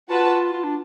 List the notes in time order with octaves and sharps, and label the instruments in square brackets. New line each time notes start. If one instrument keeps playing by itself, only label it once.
[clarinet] F4 [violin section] F#4 B4 F#5 A5
[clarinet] F4
D4